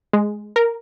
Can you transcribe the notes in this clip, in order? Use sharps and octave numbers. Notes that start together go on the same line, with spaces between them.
G#3
A#4